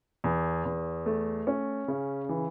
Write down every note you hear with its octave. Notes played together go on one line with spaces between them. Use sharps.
E2
E2
A3
C#4
C#3
E3